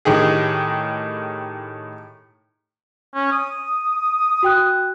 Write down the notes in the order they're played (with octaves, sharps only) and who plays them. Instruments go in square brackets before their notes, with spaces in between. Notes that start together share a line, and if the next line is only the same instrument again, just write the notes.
[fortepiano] A2 D#3 G4 G#4
[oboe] C#4
D#6
[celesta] F#4 G5 F#6